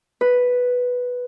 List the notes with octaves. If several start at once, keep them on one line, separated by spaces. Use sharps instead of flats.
B4